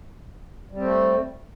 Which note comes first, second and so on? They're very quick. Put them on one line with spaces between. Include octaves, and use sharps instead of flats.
G3 C4 A3